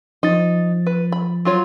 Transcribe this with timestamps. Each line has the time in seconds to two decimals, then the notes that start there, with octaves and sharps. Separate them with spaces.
0.23 F3 D#4 A6
0.87 B4
1.12 B5
1.45 F#3 F4 C#5